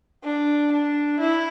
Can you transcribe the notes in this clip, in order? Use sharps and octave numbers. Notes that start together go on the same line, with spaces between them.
D4
D4
E4